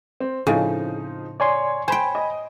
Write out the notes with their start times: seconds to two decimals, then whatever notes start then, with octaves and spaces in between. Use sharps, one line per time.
0.20 C4
0.47 A2 C#3 F3 C4 D#4
1.40 C#5 D5 G#5 C6
1.88 C5 G5 G#5 B5
2.15 D#5